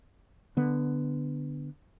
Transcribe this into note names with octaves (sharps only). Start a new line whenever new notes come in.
D3 B3